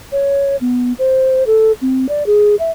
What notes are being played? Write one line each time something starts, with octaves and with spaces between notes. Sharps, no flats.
C#5
B3
C5
A4
C4
D5
G#4
E5